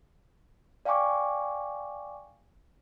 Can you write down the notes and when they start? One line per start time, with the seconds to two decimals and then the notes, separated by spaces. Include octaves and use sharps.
0.85 D5 F5 G5 G#5 C#6 D6